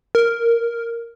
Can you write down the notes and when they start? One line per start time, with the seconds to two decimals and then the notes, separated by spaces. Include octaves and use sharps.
0.15 A#4